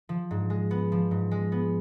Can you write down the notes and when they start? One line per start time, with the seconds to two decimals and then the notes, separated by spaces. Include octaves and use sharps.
0.09 F3
0.31 G#2
0.50 G#3
0.71 B3
0.92 F3
1.11 G#2
1.31 G#3
1.52 B3